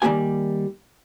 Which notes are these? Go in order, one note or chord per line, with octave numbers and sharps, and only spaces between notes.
D#3 G3 G#3 A#3 G4 G#5